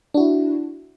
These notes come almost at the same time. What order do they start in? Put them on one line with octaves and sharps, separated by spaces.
D4 F#4 E4